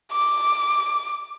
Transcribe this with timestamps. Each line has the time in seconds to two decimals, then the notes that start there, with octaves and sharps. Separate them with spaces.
0.12 D6